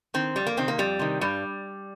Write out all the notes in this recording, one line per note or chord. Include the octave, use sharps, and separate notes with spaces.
D#3 C4
F2 G3
A#3
C3 D#3 C4
A#3
F2 G3
C3 D#3
G2 G3